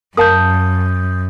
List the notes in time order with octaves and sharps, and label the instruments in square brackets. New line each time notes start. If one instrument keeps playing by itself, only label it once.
[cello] F#2 [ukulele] A#4 F5 A5 [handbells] D#6 G6